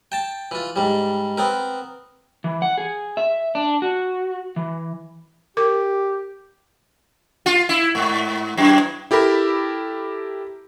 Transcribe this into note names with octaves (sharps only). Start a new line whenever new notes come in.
G5 A5
E3 F4
G#2 G3
B3 C4 A#4
E3
F#5
G#4
E5
D4
F#4
E3
G4 A#4 D6
F4
E4
G#2
F#2
E4 G4 A4 A#4 B5